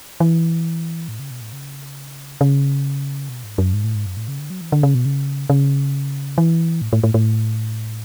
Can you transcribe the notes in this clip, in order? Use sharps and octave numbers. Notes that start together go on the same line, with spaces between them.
E3
A2
C#3
B2
A2
C#3
C#3
B2
G#2
F#2
G#2
A2
G#2
F#2
A2
C#3
D3
F#3
E3
D3
C#3
B2
C#3
C#3
E3
A2
A2
A2
A2